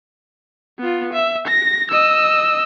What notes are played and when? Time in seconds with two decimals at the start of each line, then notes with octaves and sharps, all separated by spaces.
0.79 B3 F4
1.13 E5
1.48 A#6
1.91 D#5 E6